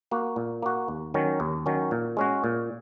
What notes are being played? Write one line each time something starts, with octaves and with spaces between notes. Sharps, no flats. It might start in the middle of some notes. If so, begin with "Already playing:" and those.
A#3 F#4
A#2
A#3 F#4
D#2
D#3 F#3 C#4
D#2
D#3 F#3 C#4
A#2
G#3 C#4 F#4
A#2